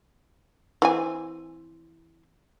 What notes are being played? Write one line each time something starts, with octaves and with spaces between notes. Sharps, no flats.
E3 C4 G#5